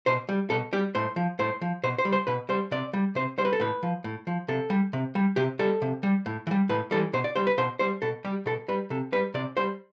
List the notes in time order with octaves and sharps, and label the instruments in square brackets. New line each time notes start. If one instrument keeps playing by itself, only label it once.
[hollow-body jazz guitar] B2 C5
G3
B2 A4
G3 G4
A2 C5
F3
A2 C5
F3
B2 C5
C5
G3
C5
B2 B4
G3 C5
C3 D5
G3
C3 C5
G3 C5
B4
A4
A2 B4
F3
A2
F3
C3 A4
G3
C3
G3
C3 G4
G3 A4
C3
G3
A2
E3
G3
A2 B4
E3 G3 A4
B2 C5
D5
G3 C5
B4
B2 C5
G3 C5
B2 A4
G3 G4
B2 A4
G3 B4
C3 A4
G3 B4
C3 D5
G3 C5